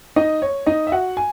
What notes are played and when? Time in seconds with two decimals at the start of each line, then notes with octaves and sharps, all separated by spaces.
0.16 D#4 D#5
0.42 C#5
0.66 D#4 D#5
0.87 E5
0.92 F#4 F#5
1.17 G#5